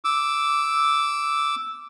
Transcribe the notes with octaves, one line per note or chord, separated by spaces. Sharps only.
D6 E6